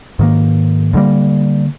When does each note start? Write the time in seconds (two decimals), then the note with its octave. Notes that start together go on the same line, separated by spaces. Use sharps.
0.19 G#2 D#3 A#3
0.93 D2 D3 G3 A#3